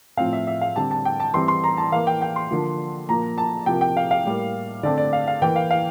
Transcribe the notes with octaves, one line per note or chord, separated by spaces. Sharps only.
A2 F3 C4 F5
E5
E5
F5
D3 G3 C4 A5
A5
G5
A5
E3 G3 C4 C6
C6
A#5
A5
E3 A#3 F5
G5
G5
C6
D3 F3 A#3
A#2 F3 A#3 A#5
A5
C3 F3 A#3 G5
G5
F5
F5
A2 G3 A#3
D3 A3 C4 D5
D5
F5
F5
E3 A#3 G5
F5
F5